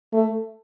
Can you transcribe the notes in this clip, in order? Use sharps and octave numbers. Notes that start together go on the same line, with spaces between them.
A3